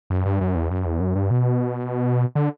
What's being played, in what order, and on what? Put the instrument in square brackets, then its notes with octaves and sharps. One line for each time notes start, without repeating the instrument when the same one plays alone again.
[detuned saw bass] F#2
G2
F#2
E2
F#2
E2
F#2
G2
B2
D3